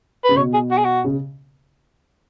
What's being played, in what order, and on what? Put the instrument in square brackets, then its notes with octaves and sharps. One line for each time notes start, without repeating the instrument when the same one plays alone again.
[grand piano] C#3 [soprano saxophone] B4
[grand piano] B2 [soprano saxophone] C#5
[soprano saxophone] G#4
F#4
G#4
F#4
[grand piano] C#3